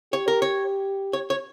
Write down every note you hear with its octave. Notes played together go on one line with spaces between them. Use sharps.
G4 C#5
A#4
C#5
C#5
C#5